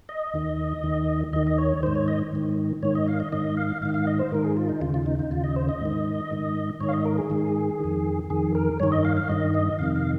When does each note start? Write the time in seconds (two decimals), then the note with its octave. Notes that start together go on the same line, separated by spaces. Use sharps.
0.09 D#5
0.34 D#2 D#3
0.83 D#2 D#3
1.33 D#2 D#3 D#5
1.47 D#5
1.58 C#5
1.83 G#2 D#3 C5
1.95 C#5
2.08 D#5
2.33 G#2 D#3
2.83 G#2 D#3 C#5
2.95 D#5
3.08 F5
3.20 D#5
3.32 G#2 D#3 D#5
3.57 F5
3.82 G#2 D#3 F5
3.94 F5
4.07 D#5
4.19 C5
4.32 G#2 D#3 A#4
4.44 G#4
4.57 F4
4.69 D#4
4.81 D#2 C#3 F4
4.94 F4
5.06 D#4
5.19 D#4
5.31 D#2 C#3 F4
5.44 D#5
5.56 C5
5.69 D#5
5.81 G#2 D#3
6.31 G#2 D#3
6.80 G#2 D#3 C#5
6.88 F5
6.93 D#5
7.05 A#4
7.18 G#4
7.30 G#2 D#3
7.80 F2 D#3
8.30 F2 D#3 G#4
8.55 A#4
8.80 G2 D#3 C#5
8.92 D#5
9.05 F5
9.17 F5
9.29 G2 D#3 D#5
9.54 D#5
9.79 F2 C3 D#3 F5
9.96 F5